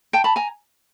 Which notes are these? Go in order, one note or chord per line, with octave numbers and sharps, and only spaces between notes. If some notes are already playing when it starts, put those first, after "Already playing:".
G5 A5
A5 B5
G#5 A#5